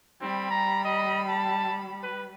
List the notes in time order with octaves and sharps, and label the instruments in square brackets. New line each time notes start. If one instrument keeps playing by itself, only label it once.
[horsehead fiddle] G3 B5 [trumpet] C4
[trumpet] A#5
D#5
A5
B4